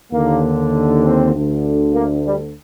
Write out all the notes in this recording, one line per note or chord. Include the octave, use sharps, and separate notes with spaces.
D#2 D3 A#3
C4
D2 D3
A#3
G3